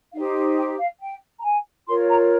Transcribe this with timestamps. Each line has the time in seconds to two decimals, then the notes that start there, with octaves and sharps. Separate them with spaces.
0.14 D#4 G4 C5 F5
0.57 G5
0.78 F5
1.01 G5
1.39 A#5
1.43 G#5
1.87 F4 A#4 C#5 C6
2.09 A#5